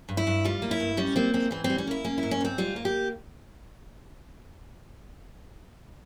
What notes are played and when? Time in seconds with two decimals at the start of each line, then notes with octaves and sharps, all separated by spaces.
0.09 G2
0.17 E4
0.27 G2
0.45 G3 F4
0.62 A#3
0.71 E4
0.80 G2
0.97 G3 C#4
1.16 A#3 C4
1.34 G#2 C4
1.51 E3 C4
1.64 C4
1.70 G3
1.78 C#4
1.87 A#3 E4
2.05 A#3 C#4
2.18 E4
2.23 G#2
2.31 C#4
2.41 G#2 C4
2.58 G3 F4
2.76 A#3
2.85 G4